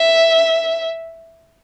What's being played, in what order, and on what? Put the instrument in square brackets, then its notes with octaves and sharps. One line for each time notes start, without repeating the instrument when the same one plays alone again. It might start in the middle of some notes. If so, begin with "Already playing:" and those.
Already playing: [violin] E5